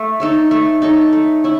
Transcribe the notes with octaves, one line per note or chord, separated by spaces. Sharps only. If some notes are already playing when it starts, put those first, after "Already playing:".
Already playing: A3
D#4 A4 C#5
A3
D#4 A4 C#5
A3
C#4 E4